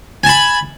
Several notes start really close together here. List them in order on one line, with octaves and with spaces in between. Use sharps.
G#5 A5 B5